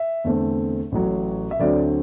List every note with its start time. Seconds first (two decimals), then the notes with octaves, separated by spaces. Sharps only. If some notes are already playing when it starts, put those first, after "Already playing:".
Already playing: E5
0.24 E2 D3 A3 C4
0.92 A1 A2 F#3
1.51 E5
1.60 D2 D3 F#3 C4 D5